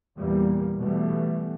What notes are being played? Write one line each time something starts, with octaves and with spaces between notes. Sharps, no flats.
E2 A#2 E3 G3 A#3
B2 E3 G3 A3 B3